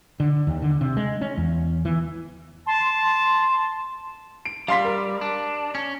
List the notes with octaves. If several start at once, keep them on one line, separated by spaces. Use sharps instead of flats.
D3
D#2
D3
C3
G#3
C#4
E2
E3
A5 C6
D7
G3 F5 C6 B6
A#4
D4
C#4